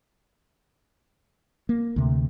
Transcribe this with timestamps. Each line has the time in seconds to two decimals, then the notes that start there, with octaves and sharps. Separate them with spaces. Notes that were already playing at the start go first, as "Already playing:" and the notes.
1.69 A#3
1.96 D2 C3